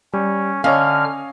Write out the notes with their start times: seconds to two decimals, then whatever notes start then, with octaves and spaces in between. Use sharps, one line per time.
0.13 G3 C#4
0.64 D3 C#4 C#5 D#5 F5 F6